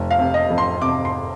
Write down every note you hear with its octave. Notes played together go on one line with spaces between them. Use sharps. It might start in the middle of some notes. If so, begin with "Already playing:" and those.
Already playing: F1
F5
C3
D#5
F2
C6
C3 D6
C6